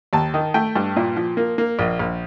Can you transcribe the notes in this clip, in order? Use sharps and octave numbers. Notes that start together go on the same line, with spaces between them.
D#2 A5
D#3
A3 G5
G2
A#2
F3
A#3
A#3
A#1
A#1